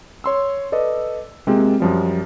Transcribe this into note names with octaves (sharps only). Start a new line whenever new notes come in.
C#5 C6 E6
A4 B4 D5 D#5
C3 G#3 A#3 C4 F4
F#2 F3 G3